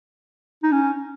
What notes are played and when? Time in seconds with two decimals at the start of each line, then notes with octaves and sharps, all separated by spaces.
0.63 D#4
0.72 C#4